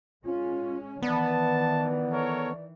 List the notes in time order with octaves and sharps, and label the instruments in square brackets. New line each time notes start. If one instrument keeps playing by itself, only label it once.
[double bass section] G#3 C#4 [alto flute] F4
[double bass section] D#3 E3 [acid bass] B3 [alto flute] D5 [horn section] A5
[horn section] A4 A#4 C#5